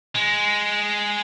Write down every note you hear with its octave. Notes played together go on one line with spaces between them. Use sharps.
G#3